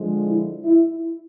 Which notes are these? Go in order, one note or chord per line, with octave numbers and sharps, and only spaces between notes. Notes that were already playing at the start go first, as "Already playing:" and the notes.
Already playing: D3 F3 G#3
E4
E4